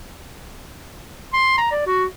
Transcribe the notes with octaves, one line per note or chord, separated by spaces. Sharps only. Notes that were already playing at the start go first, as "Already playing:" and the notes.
C6
A#5
D5
F#4